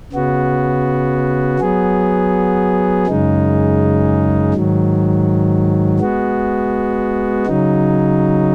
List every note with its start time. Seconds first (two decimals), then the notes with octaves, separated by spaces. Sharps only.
0.12 C#3 B3 F#4
1.59 F#3 B3 G#4
3.07 F#2 C#3 G#3 D#4
4.54 G#2 D#3 F#3
6.00 G#3 B3 F#4
7.47 C#3 F#3 D#4